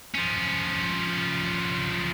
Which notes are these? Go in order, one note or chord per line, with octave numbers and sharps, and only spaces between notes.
F3 C#4